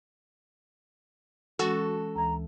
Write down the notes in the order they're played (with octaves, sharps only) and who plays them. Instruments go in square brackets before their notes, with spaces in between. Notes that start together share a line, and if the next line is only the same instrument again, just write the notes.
[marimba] E3 G#3 C#4 [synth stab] F#4 [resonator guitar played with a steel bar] A4
[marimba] D2 E3 [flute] A#5